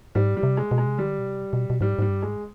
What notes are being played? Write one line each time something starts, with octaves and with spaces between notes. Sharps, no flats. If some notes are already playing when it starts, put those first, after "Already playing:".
G#2 G3
G3
C3
G#3
B2
G#3
C3
D3 G3
B2
C3
B2
B2
G#2 G3
G#2 G3
G2
G#2 G#3